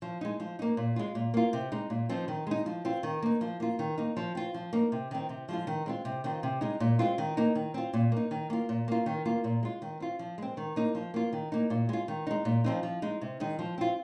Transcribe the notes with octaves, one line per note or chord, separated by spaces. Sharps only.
F3
G#3 D#4
F3
A#3 D#4
A#2
G#3 F4
A#2
A#3 F4
C3
G#3 D#4
A#2
F3 C4 D#4
D#3
G#3 D#4
F3
C4 F4
D#3
A#3 D#4
F3
A#3 F4
D#3
A#3 D#4
F3
C4 F4
F3
A#3 D#4
C3
D#3 C4
C3
F3 G#3 F4
D#3
G#3 C4 F4
C3
D#3 C4 F4
C3
G#3 D#4
A#2
G#3 C4 F4
D#3
A#3 D#4
D#3
C4 F4
A#2
A#3 D#4
D#3
A#3 F4
A#2
A#3 F4
D#3
A#3 F4
A#2
G#3 F4
D#3
C4 F4
F3
G#3 C4
D#3
A#3 D#4
F3
A#3 F4
D#3
A#3 D#4
A#2
G#3 F4
D#3
G#3 D#4
A#2
F3 C4 D#4
F3
G#3 D#4
C3
D#3 G#3 D#4
F3
C4 F4